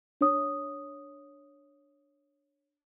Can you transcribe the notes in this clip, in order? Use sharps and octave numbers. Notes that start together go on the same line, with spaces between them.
D4 C#5 D#6